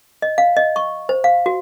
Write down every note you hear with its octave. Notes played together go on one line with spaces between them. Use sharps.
D#5
F5
D#5
C#6
C5
F5
F#4